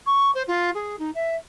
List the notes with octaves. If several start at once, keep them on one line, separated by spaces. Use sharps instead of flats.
C#6
C5
F4
G#4
D#4
E5